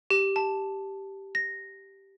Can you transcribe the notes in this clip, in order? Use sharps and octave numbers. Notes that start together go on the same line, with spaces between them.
G4
A5
A#6